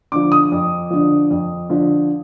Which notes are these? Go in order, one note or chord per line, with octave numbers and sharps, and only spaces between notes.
D3 F3 D6
D#6
F2
D3 F3
F2
D3 F3